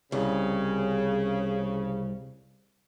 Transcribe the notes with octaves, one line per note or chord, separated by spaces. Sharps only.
C2 C#3